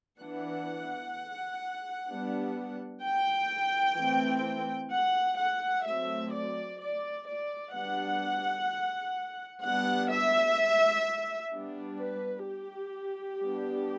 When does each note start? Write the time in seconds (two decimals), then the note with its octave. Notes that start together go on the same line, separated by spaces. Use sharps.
0.19 E3 B3 D4 F#5
2.08 G3 B3 D4
3.02 G5
3.97 E3 A3 C4
4.91 F#5
5.38 F#5
5.85 F#3 A3 C4 E5
6.32 D5
6.80 D5
7.27 D5
7.74 G3 B3 D4 F#5
9.63 G3 B3 D4 F#5
10.11 E5
11.52 G3 B3 D4
11.99 B4
12.47 G4
13.40 G3 B3 D4